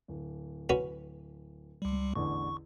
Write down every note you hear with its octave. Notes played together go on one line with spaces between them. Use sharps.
D1
C#4 F#4 B4
C#2 G3
A1 E2 D3 C#6